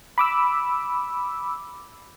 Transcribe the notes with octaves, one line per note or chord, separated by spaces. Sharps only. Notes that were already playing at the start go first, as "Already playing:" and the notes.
B5 D6 E6